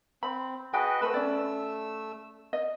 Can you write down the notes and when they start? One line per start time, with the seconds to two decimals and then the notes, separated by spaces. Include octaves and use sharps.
0.23 C4 B5
0.73 F#4 G#4 B4 D#5 G5
1.02 A3 B4 C5 E6
1.14 C#4 D5
2.53 D#5